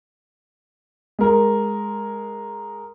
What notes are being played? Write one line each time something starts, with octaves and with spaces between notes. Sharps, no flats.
G#3 A#4